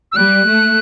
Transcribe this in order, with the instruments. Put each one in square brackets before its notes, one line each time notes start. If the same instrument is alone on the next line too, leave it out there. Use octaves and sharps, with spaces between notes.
[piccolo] E6
[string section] G3 [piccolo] F#6
[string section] A3